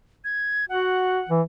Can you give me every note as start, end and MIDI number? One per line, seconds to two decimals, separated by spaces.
0.24 0.65 92
0.69 1.21 66
0.69 1.30 78
1.29 1.42 52